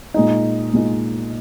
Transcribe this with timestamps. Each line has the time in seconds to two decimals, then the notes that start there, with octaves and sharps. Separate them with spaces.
0.14 A#2 G#3 D#4
0.74 A#2 G#3 D#4